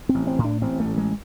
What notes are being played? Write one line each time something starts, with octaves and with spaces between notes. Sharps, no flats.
C4
A1
C4
A2
D4
A1 C4
A3
A1
G#3